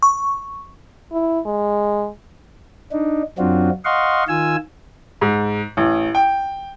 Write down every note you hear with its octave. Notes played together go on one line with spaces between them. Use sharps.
C#6
E4
G#3
D4 D#4
F#2 F#3 C4 D4 F4 F#4
D#5 F5 F#5 C6 C#6
D#3 F4 G#5 E6
G#2
A1
G5